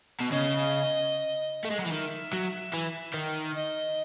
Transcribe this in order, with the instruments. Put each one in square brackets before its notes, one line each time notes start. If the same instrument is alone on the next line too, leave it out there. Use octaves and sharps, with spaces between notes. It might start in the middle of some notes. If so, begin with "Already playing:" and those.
[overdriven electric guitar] B2
[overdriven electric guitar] C#3 [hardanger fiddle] D#5
[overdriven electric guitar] A3
G#3
F#3
E3
[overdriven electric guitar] D#3 [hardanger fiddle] E5
[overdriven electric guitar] F#3
E3
D#3
[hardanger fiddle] D#5